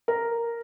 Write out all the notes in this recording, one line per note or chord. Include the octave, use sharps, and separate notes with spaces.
A#4